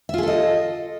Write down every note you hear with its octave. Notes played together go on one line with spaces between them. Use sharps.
F4 G#4 A4 D#5 E5